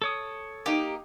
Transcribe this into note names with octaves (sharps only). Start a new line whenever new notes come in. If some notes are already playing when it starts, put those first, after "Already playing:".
A4 C#5 D#6
A#3 D#4 G4